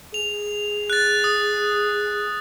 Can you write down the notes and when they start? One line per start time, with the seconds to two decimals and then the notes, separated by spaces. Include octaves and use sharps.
0.14 G#4 F7
0.90 F#6 A6
1.24 D#6